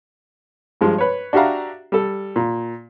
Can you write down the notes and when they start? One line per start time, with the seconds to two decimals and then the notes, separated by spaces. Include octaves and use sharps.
0.81 G2 F3 G#3
0.98 B4 C#5
1.33 D4 F#4 G4 E5 F5 A#5
1.92 G3 A4
2.36 A#2